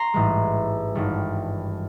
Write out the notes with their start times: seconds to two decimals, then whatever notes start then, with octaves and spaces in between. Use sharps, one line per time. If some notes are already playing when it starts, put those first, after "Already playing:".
Already playing: A#5 C6
0.14 A1 G#2 E3 G#3
0.95 G#1 G2 E3 G3